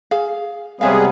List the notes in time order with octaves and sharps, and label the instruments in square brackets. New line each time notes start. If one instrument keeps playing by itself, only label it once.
[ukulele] G#4 F5
[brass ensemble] C3 B3 [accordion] G3 G#3 G#4 [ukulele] C#5 E5 F5